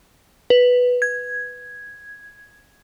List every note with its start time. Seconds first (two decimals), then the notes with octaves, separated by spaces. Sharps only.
0.50 B4
1.02 G#6